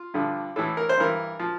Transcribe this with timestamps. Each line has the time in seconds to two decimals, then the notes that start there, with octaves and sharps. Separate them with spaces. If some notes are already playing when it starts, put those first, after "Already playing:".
Already playing: F4
0.14 G2 D3 F3
0.56 A2 E3 A4
0.77 A#4
0.89 C5
0.97 G2 E3 A#4
1.39 F3